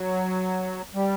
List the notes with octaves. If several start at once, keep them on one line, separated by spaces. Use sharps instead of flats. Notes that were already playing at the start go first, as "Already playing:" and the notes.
Already playing: F#3
G3